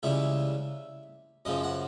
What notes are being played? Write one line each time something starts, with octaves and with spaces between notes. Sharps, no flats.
C#2 C#3 E3 G3 E5
F#2 C#3 F3 D#5
F#5